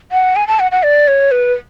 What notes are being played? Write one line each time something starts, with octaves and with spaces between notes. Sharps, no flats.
F#5
G#5
A5
F#5
F#5
D5
C#5
B4